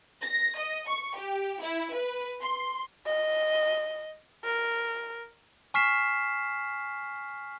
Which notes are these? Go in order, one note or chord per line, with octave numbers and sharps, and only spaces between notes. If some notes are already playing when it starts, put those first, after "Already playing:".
A#6
D#5
C#6
G4
E4
B4
C6
D#5
A#4
G#5 C#6 F6 B6 C7 E7